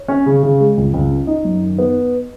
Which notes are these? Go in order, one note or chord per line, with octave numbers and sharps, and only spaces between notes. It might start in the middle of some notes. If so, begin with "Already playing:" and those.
Already playing: C#5
C#4
C#3
C#3
G#3
C#2
C#2
C#4
D#4 D#5
F#2
D#3
B3